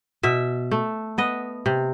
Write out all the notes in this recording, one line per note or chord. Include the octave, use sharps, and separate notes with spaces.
B2 E5
A3
B3 D#5
C3